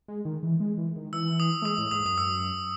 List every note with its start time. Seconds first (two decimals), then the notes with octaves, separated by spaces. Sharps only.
0.08 G#3
0.25 D#3
0.43 E3
0.60 G#3
0.78 E3
0.96 D#3
1.13 E3 E6
1.40 D#6
1.62 A3
1.65 G#3 D#6
1.78 A2
1.91 G#2 D#6
2.05 F#2 D#6
2.18 E6